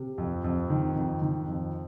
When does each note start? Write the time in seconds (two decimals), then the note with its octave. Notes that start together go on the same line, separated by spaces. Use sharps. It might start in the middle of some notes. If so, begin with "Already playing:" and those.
Already playing: C3
0.18 F2
0.44 F2
0.70 D#3
0.96 F2
1.22 D#3
1.48 F2